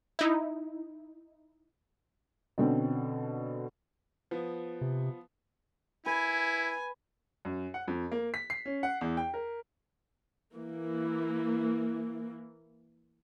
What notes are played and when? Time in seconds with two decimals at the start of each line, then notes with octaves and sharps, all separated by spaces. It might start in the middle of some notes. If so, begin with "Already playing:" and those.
0.19 D#4 E4
2.58 B2 D3 C4 C#4
4.31 F3 B3
4.81 C3
6.06 E4 B4 G#5
7.45 F#2
7.74 F#5
7.88 F2
8.12 A#3
8.34 B6
8.50 C7
8.66 C#4
8.83 F#5
9.01 E2
9.17 G5
9.34 A#4
10.54 E3 A#3